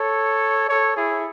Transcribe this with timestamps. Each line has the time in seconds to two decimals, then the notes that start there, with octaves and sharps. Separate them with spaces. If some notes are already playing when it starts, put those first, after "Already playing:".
Already playing: A4 C#5
0.69 A4 C#5
0.97 E4 G#4